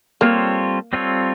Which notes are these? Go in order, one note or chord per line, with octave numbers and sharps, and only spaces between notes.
G3 A#3 C4 F4 A4 C#5
G3 C4 F4 A4 C#5